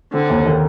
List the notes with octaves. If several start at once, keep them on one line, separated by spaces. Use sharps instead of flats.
D3 C4
D#2
D#3